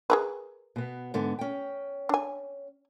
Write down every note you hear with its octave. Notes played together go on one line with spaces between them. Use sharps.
G#4 A#4 B4
B2 B3
G#2 D3 B3
C#4 G5
D4 G#5